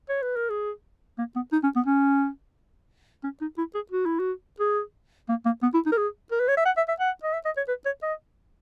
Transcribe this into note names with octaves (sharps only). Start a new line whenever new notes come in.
C#5
B4
A#4
G#4
A#3
B3
D#4
C#4
B3
C#4
C#4
D#4
E4
G#4
F#4
E4
F#4
G#4
A#3
A#3
B3
E4
D#4
A#4
G#4
A#4
B4
C#5
E5
F#5
E5
E5
F#5
D#5
E5
D#5
C#5
B4
C#5
D#5